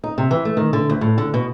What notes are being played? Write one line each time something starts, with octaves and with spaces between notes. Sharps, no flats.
D#4
C3
E3
A3
D#3
D3
D2
A2
D3
B2